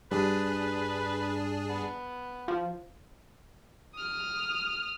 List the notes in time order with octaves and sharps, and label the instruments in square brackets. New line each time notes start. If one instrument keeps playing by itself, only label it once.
[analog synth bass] G2 [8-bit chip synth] D4 G#4 [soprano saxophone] B4
[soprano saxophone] B3
[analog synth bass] F3
[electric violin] D#6 F6